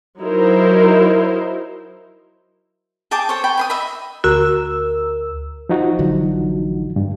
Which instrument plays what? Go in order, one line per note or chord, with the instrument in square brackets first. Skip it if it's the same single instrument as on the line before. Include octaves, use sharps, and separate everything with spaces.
[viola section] F#3 D#4 E4 A#4 C5
[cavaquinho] G#4 G5 A5 D6
A4 C5 C#5
G5 G#5 B5
G#5 B5 D#6
D#5 E5 B5
[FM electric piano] D2 A#4 E6 [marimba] F#4
[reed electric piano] F3 D#4 F#4
[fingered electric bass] A1 D3 F#3
[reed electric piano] G2